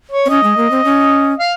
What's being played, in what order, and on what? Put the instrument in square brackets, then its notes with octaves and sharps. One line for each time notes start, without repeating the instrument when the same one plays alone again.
[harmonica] C#5
[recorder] C4
[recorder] C#4 [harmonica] D#5
[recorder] G#3
A#3
C4
C#4
[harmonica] F5